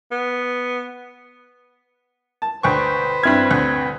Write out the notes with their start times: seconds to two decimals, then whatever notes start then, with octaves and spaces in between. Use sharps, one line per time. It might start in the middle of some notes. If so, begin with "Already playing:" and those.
0.12 B3
2.42 A5
2.63 D2 B4 C5 G5 C#6
3.23 G2 C4 E4 F6 G#6
3.51 D2